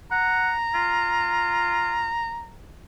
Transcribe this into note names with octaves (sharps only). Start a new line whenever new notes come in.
F#5 A#5
F4